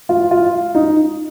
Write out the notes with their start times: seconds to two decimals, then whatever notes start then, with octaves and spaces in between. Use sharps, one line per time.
0.09 F4
0.31 F4
0.75 D#4